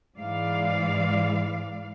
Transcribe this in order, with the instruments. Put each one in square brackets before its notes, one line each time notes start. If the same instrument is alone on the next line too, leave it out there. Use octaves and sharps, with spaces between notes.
[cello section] G#2 E3 G#3 D5 F5